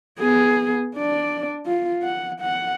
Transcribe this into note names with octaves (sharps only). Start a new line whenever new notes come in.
B3 G#4
D4 D5
F4
F#5
F#5